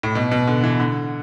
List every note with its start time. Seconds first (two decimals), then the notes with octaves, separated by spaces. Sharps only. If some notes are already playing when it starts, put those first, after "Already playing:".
0.03 A2
0.15 B2
0.31 B2
0.47 D3
0.64 E3
0.80 D3